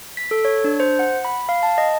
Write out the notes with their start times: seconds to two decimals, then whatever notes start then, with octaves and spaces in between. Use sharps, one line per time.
0.17 B6
0.31 A4
0.45 C#5
0.64 D4
0.80 C5
0.99 F#5
1.25 B5
1.49 F5
1.63 A5
1.78 D#5